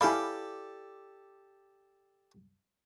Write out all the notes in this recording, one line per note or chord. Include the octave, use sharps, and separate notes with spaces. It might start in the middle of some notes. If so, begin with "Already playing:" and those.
E4 G4 A4 D5 F5 G#5 B5